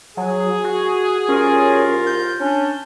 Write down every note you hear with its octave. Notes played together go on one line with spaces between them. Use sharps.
F#3 G#4
F#4
C2 C#4 F4 A#4
G6
C#4 D4